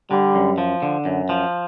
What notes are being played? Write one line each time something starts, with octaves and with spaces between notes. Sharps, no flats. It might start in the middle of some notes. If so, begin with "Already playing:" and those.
D3 G3
F#2
F3
D3
F#2
F3